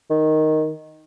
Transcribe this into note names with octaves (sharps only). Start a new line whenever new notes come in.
D#3